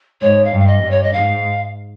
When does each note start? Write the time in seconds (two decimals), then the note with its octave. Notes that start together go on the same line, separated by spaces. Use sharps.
0.21 G#2 C#5
0.45 F5
0.52 G2
0.60 F5
0.67 D#5
0.82 G2
0.91 C#5
1.03 D#5
1.13 G#2 F5